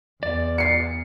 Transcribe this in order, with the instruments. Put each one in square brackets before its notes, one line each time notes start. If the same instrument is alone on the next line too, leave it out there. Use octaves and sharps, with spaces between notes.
[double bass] E2 [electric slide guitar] D5
[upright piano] C7 C#7